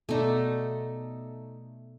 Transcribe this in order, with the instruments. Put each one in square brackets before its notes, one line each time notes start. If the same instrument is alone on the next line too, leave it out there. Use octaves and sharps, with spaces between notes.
[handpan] B2 B3 D5 [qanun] A3 D#4